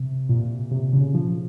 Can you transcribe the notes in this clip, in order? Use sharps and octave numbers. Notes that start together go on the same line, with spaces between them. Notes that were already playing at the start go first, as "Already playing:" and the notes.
Already playing: C3
A#2
C3
C#3
F3